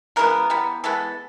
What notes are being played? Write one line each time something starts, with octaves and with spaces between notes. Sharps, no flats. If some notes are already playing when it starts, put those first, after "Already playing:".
C#3 E3 G#3 B3 A#4
E3 G3 B3
E3 G#3 B3 A4